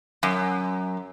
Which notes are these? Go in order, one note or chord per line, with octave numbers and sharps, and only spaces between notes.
F#2